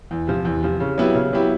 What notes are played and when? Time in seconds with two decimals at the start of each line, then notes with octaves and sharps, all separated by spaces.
0.11 E2
0.27 C3 F3
0.45 E2
0.63 C3 F3
0.80 C#3
0.98 F#3 B3 E4 G4
1.15 C#3
1.33 F#3 B3 E4 G4